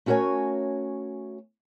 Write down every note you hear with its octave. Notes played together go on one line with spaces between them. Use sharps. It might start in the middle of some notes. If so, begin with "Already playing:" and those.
A3 C#4 F#4 A#4 C#5 G#5